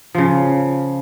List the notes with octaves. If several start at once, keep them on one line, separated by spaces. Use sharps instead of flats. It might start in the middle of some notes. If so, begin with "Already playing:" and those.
C#3 F3